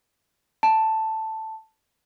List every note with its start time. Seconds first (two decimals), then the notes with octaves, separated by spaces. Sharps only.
0.63 A5